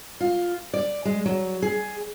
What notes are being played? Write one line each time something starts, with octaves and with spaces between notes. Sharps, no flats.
F4
D5
G#3
F#3
G#4